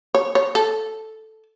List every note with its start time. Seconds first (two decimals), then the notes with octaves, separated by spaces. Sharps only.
0.15 C#5
0.35 C#5
0.55 A4